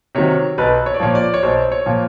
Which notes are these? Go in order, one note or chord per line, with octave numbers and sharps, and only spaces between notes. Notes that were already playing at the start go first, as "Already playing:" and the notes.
C3 D#3 F#3 C#5
B1 B4
C#5
D5
A#2 F3 C#5
D5
C#5
B1 C5
C#5
A#2 F3